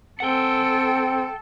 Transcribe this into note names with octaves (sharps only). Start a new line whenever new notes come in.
C4 A4 F#5 G5